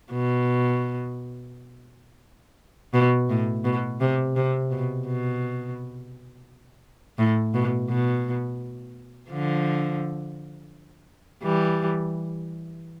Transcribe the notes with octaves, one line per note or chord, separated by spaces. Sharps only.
B2
B2
A2
B2
C3
C3
B2
B2
A2
B2
B2
D3 F3
E3 G3